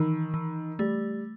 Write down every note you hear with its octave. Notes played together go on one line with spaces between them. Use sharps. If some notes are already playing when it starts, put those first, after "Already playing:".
Already playing: D#3 E3
E3
G3 A3